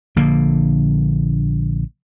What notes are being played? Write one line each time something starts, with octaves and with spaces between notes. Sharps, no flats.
A#1 D3 A#3